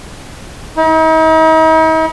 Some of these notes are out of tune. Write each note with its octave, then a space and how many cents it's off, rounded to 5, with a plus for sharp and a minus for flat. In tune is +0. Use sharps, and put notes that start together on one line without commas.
D#4 +45